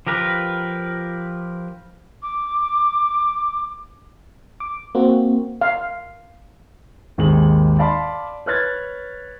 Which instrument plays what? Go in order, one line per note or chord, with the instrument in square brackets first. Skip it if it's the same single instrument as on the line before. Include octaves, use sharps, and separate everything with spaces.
[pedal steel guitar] F3 G4 A#4 B4
[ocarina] D6
[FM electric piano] D6
A#3 C4 F#4
[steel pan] F5
[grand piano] G#1 D#2 G#3 G#4 F#7
D5 F5 A5 B5 C6 D6
B4 C#5 F6 F#6 G#6 A6